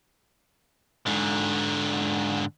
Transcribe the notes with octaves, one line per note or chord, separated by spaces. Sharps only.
G#2 D3